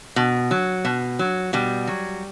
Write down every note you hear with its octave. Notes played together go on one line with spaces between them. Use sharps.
B2
F#3
B2
F#3
B2 G3
F#3